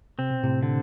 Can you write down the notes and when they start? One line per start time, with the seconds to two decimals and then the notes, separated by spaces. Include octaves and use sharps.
0.19 C3 C4
0.31 B2
0.44 A2 C3
0.63 D3